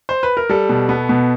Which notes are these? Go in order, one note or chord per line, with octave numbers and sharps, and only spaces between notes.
C5
B4
A#4
G3 A4
B2
B3
B2